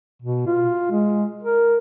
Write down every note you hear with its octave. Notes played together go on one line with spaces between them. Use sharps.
B2
F4
G#3
A#4